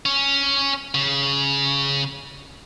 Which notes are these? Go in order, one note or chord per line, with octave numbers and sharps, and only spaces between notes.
C#4
C#3